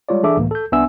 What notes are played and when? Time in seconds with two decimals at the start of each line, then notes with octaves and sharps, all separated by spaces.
0.09 G3 G#3 F4 C#5 D5
0.23 E3 D4 G#4 A4 E5 D6
0.37 C#2 A2 E3 A#3
0.51 A4 G6
0.72 C2 B3 D4 E5 G#5 E6